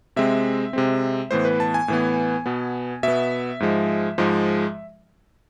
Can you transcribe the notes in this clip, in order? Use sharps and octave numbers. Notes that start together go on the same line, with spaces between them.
C3 G#3 C4 E5
C3 G#3 C4
A2 E3 B3 C5
B4
A5
G#5
A2 E3 B3
B2 B3
B2 B3 E5
G#2 F3 G#3
G#2 F3 G#3